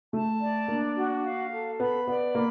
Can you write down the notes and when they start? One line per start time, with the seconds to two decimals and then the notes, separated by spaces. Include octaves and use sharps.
0.13 A3 A5
0.41 D5
0.68 A#3 D4
0.96 F#4
1.24 F5
1.52 A4
1.80 B3 B5
2.07 B3 D5
2.35 A#3 B5